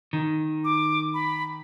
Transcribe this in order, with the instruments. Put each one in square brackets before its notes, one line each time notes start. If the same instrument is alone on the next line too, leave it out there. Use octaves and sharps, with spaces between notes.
[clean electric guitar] D#3
[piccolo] D6
B5